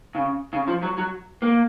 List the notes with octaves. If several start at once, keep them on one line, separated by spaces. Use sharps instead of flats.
C#3
C#3
F3
F#3
F#3
A#3